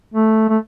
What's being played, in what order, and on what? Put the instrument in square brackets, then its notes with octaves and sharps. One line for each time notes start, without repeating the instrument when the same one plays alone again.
[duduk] A3
A3